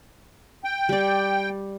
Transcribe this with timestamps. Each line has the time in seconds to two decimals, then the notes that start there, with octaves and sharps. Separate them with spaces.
0.64 G5
0.89 G3 D5